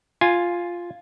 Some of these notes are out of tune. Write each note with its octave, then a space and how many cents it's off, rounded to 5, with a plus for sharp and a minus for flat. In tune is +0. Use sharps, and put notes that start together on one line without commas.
F4 +0 G#5 +0